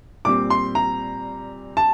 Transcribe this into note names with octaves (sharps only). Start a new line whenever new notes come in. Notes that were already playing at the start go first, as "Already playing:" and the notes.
A#2 G3 C4 D6
C6
A#5
A5